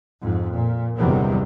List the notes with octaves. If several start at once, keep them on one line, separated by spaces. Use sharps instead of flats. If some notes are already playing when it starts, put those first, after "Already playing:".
F2 G#2
A#2
G1 E2 C3 D#3 F#3 G3